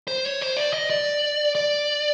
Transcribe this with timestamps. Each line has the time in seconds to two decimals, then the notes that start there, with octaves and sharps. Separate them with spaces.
0.08 C5
0.25 C#5
0.41 C5
0.57 D5
0.73 D#5
0.90 D5
1.55 D5